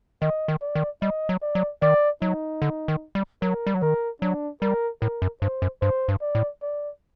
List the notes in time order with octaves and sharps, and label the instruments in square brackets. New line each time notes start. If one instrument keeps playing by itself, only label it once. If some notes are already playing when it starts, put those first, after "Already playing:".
[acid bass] D#3 [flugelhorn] D#5
[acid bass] D#3
[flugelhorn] D5
[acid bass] D#3
[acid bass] G3 [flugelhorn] D#5
[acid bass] F#3
[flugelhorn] D5
[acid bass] F#3
[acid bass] D#3 [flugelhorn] D5
[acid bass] F#3 [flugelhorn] D#4
[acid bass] D3
D#3
G3
[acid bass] F#3 [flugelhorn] A#4
[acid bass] G3
F#3
[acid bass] D#3 [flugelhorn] A#4
[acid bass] F#3 [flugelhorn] D4
[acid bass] G3 [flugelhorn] A#4
[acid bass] A2 [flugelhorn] A#4
[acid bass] F#2
[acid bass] G2 [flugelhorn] C5
[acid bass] F#2
[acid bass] G2 [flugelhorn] C5
[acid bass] G2
[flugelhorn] D5
[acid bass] A2
[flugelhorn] D5